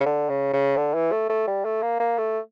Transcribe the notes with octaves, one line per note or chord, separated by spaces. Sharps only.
C#3
D3
C#3
C#3
D3
E3
A3
A3
G3
A3
A#3
A#3
A3